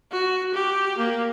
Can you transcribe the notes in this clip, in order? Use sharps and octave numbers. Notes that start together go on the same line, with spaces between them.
F#4
G4
A#3